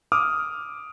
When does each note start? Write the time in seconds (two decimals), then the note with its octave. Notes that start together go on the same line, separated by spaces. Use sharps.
0.12 D6 D#6 F6